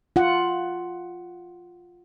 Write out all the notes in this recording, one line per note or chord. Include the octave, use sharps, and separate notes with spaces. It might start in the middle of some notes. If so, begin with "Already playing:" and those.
F4 F#5